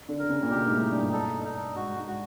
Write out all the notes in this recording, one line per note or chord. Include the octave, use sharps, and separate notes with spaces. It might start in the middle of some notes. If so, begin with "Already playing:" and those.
D3
D3 A#4
C#3
A#2
B2 G4
G#2
A2
D#4
G2
A4
D#4
G#2 F#4
G#2
F#4